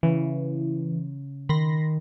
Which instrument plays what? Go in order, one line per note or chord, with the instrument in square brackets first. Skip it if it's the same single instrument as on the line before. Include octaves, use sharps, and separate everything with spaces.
[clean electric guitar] C#3 [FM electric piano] E3
[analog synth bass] D#3 [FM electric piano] B5 C6 A#6